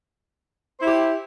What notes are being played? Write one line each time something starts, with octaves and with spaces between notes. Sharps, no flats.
E4 G4 C5